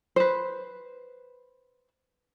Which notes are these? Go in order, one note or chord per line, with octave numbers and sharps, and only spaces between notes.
B4 C5